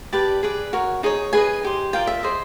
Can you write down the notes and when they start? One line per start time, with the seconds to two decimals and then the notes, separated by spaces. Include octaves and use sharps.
0.12 G4 B4 D5 A5
0.43 G#4 B4 D5
0.73 F#4 A#4 C#5
1.03 D#4 G#4 C#5
1.33 G#4 B4 D#5 G#5
1.63 D#4 G4 C5
1.93 F4 A#4 D5 G5
2.07 E5
2.23 G#4 C5 D#5